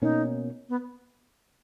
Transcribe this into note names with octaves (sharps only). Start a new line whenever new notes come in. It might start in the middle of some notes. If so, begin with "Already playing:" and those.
B2 A#3 C#4 D#4
B3